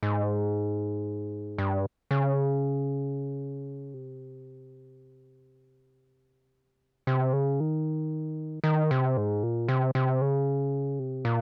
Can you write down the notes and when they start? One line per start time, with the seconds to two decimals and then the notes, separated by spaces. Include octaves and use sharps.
0.03 G#2
1.58 G2
2.11 C#3
3.94 C3
7.07 C3
7.33 C#3
7.60 D#3
8.64 D#3
8.91 C3
9.17 G#2
9.43 A#2
9.68 C3
9.95 C3
10.21 C#3
10.99 C3
11.25 A#2